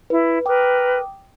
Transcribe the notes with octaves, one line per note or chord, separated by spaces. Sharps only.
E4 B4
A#4 B4 G5 D6 D#6